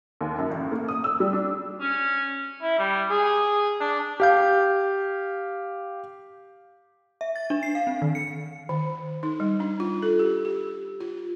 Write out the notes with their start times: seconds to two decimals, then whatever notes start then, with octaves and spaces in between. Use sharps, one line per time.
0.21 D#2
0.38 F#2
0.50 A1
0.72 A#3
0.88 D#6
1.04 E6
1.20 G3
1.33 D4
1.81 C#4
2.62 E4
2.79 G3
3.10 G#4
3.80 D4
4.20 G4 F5 G6
7.21 E5
7.36 A6
7.50 D4
7.63 C7
7.75 F5
7.87 C4
8.02 D#3
8.15 C#7
8.69 D#3
9.23 D#4
9.40 G3
9.60 D4
9.80 F4
10.02 A4
10.19 G4
10.45 G4
11.00 F4